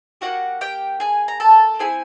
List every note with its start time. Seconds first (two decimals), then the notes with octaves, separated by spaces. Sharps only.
0.21 A#3 D4 F#4 G4 F#5
0.61 G4 G5
1.00 G#4 G#5
1.28 A#5
1.40 A4 A5
1.79 C4 E4 G#4 G#5